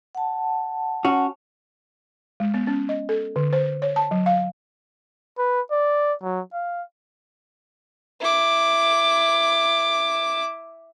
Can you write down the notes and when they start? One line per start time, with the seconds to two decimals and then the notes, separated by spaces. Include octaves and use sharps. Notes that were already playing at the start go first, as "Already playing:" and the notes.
0.15 F#5 A5
1.05 C#4 F#4
2.40 G#3
2.54 B3
2.67 C#4
2.89 D#5
3.09 A4
3.36 D3
3.53 C5
3.82 C#5
3.96 A5
4.11 F#3
4.26 F5
5.38 B4
5.71 D5
6.23 F#3
6.53 F5
8.21 E4 D6